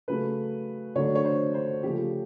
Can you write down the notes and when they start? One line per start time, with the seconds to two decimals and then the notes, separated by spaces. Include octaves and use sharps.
0.08 C#3 F#3 A3 B4
0.96 D3 F#3 A3 D4 C#5
1.15 C#5
1.25 C5
1.54 C5
1.83 C#3 F3 A3 G4